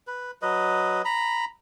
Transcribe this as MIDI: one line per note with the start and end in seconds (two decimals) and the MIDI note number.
0.07 0.31 71
0.42 1.02 54
0.42 1.02 71
0.42 1.02 75
1.05 1.45 82
1.05 1.45 83